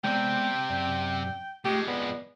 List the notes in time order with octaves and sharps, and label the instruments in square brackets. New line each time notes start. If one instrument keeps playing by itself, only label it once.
[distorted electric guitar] C3 C4 [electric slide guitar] G#3 B3 D5 [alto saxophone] G5
[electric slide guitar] F#2 D5
[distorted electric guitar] F2 G#3 [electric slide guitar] A3 [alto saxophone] G4
[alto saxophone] B3 [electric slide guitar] D5